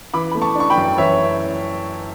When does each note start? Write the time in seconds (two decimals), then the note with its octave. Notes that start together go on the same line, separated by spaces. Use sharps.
0.14 E3 B5 D6
0.32 A3 B5
0.42 A5 C#6
0.55 D4 C#6
0.70 G5 B5
0.77 F#2
0.98 E3 C#5 E5